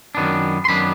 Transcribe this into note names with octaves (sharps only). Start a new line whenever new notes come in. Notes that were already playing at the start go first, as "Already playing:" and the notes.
F#2 D#3 F#3 B3 D4
C6
F#2 D#3 F#3 B3 D4 B5